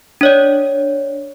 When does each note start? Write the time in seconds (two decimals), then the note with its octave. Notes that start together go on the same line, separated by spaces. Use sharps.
0.21 D4 C#5 D5